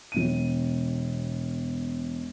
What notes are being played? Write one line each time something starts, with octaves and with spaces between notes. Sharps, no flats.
E1 B2 D#7